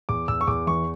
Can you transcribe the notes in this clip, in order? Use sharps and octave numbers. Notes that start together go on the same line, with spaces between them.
E2 D6
E2 E6
C#6
E2 D6
E3 C#6